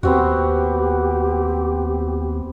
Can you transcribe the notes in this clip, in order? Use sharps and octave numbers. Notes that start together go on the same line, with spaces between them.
D#2 B3 C4 F#4 G4